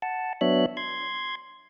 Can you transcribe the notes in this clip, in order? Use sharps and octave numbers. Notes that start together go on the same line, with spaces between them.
F#5 A5
F#3 B3 D4 C#5 E5 F#6
C6 G#6